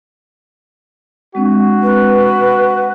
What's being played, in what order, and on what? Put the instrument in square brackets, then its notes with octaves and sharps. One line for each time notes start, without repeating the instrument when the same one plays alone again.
[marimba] G#3 C4 D4 [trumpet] F#4
[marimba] G#3 C4 [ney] B4